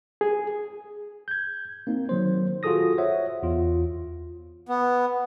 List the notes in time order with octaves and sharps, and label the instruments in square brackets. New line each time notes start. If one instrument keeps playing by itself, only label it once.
[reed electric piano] G#4
[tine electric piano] G6 G#6
A#3 C4 D#4
D#3 F#3 C5
F4 F#4 G#4 A4 D#6 A#6
C5 C#5 E5 F#5
E2 F4
[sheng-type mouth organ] B3